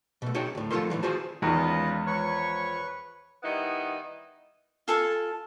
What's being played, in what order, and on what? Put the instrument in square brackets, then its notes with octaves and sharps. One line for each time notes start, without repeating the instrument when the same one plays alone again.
[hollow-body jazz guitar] B2 A3
D#4 F#4 G#4 C#5 G5 A5
D2 A2
F3 A3 F4 A4 A#4 C6
A2 D#3 E3 F#3
F4 F#4 G#4 C5 A5
[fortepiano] E2 D#3 [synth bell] G#3 [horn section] C#4 F4 [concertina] B4 D#5
[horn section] F3 C#5 [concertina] B4 C#6
[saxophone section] D#3 G3 B3 D#4 E4 F#5
[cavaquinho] F4 A4 G#5 A5